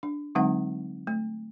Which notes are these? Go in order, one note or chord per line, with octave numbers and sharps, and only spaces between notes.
D4
D3 F#3 G#3 C4 D#4 F#5
A3